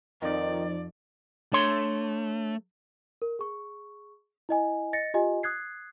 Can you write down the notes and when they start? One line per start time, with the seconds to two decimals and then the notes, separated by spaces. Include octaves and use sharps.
0.22 F2 D#3 F3 D#4 D5
1.53 A3 D4 C#5 C6
3.22 A#4
3.39 G#4 C#6
4.49 E4 D#5 G#5
4.93 D#5 A6 A#6 C#7
5.14 F4 G4 D#5 G#5
5.43 D#6 F#6 G#6 C7